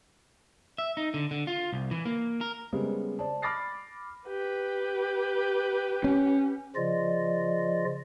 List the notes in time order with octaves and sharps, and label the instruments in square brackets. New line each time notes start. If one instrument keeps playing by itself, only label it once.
[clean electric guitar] E5
D#4
D3
D3
F4
C2
E3
A#3
A#4
[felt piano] C#3 G3 G#3 B3 A#4 C5
C5 D5 A5
B5 D6 F6 A6 A#6 C7
[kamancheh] G4 B4
[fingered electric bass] C#4
[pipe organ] C#3 F3 F4 D5 D#5